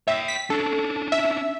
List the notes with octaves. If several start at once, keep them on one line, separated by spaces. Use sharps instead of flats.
C#5 E5 G5
B6
C#4 D4 A4
E5